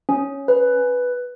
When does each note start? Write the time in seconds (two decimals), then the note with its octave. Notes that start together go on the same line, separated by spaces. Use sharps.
0.09 C#4
0.48 B4